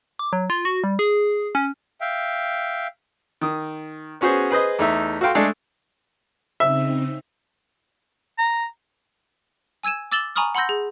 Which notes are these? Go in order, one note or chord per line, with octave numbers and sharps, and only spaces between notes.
D6
F#3
F4
F#4
G3
G#4
C#4
E5 F5 G5
D#3 D#6
B3 C#4 F#4 G#4 C5
G#4 B4 C5 D#5
E2 A3 D#4 E5
F#4 A4 F5 G5 C6
G#3 A3 D4 G#4 A4
C#3 C4 D#4 E5
A#5
G#5 E6 G#6 D#7 E7
D6 E6 A6 E7 F#7 G7
G#5 A#5 B5 C#6 D#6 F6
F#5 B5 C6 E6 G6 A#6
G#4